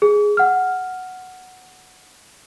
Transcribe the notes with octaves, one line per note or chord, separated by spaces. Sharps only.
G#4
F#5 F6